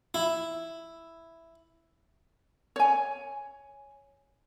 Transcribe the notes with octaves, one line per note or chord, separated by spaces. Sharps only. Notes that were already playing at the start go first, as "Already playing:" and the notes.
E4
C#5 G#5